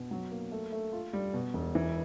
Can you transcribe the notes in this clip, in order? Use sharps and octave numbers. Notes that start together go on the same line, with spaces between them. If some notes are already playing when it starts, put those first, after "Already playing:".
Already playing: B2
F#3
A#3
A3
A3
F4
G3
B2
E1
E3